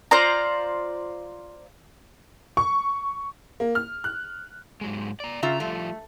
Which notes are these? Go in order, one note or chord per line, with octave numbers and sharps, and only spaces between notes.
F4 C5 D5 A#5
C#6
A#3
F6
F#6
G#2 F#3 G#3
D5 A#5
C#3 F4 E5 A#5
F3 G3 A3 F4